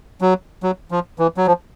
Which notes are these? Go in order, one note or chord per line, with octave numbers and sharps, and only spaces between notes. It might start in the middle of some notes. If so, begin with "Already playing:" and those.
F#3
F#3
F3
E3
F#3
F3